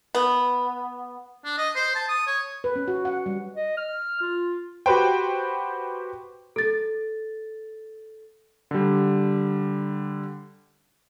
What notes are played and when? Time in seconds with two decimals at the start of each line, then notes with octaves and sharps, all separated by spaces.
0.15 B3
1.45 D4
1.58 D#5
1.76 C5
1.95 A5
2.09 D#6
2.27 C#5
2.64 B4
2.76 C#4
2.88 F#4
3.05 F#5
3.26 G3
3.55 D#5
3.77 F6
4.21 F4
4.86 F#4 G4 B4 C5 G5
6.56 A4 A6
8.71 D3 G3